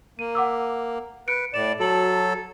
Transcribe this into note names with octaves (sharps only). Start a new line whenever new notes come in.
A#3 D#7
F#5 D6 E6
B4 F#6 C#7 D7
A2 D5 E7
F#3 F#4 A4 A5 F#7